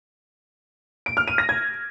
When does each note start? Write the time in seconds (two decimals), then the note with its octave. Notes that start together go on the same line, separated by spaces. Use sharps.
1.06 D7
1.17 F6
1.28 D#7
1.38 A#6
1.49 G#6